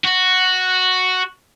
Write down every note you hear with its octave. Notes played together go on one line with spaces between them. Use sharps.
F#4